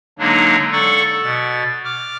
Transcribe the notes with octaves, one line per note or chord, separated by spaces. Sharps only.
D3 F#3 G#3 A#3 D4 D#4
A4 D5 F#5 C#6
B2 A6
D6 F6